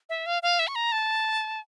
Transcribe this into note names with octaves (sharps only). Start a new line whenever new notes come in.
E5
F5
F5
E5
C#6
A#5
A5